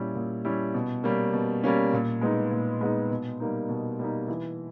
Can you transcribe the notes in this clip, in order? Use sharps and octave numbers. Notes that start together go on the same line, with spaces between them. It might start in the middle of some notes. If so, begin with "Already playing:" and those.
Already playing: A#2 G3 C#4 E4
A#2
G3 C#4 E4
B2
G3 A#3 C#4
B2
G3 A#3 C#4
A#2
G#3 B3 D#4
A#2
G#3 B3 D#4
B2
G3 A#3 D#4
B2
G3 A#3 D#4
E3